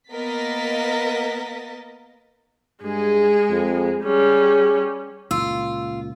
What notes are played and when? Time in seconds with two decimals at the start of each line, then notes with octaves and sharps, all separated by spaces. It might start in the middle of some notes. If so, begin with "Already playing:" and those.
0.10 A#3 B3 A#4 D#5 A6 B6
2.83 G2 G#3 G#4
3.50 F2
4.04 G3 C#4 G#4
5.31 C#2 A#2 F4 E6